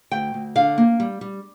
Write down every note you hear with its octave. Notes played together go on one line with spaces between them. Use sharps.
D2 G5
D2
D3 F5
A#3
G3
G3